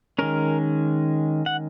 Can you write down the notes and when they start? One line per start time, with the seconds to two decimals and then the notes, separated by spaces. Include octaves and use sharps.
0.18 D#3 G#3 C#4 A#4
1.46 F#5